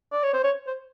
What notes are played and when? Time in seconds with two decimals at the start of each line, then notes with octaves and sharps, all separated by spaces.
0.12 D5
0.23 C#5
0.33 C5
0.44 C#5
0.67 C5